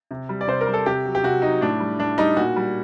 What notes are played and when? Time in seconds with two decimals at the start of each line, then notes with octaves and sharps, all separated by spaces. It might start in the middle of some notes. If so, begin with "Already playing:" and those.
0.11 C3
0.29 G3
0.41 D5
0.47 C3 C5
0.61 A#4
0.67 G3
0.74 A4
0.86 C3 G4
1.05 F#3
1.15 G4
1.23 C3 F#4
1.42 F#3 D#4
1.61 A2 D4
1.80 G3
1.99 A2 D4
2.18 G3 D#4
2.37 A#2 F#4
2.56 G3